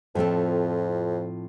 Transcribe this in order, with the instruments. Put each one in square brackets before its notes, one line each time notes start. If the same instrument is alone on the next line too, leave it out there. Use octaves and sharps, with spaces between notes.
[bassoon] F2 [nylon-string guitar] A2 F3 C4 A4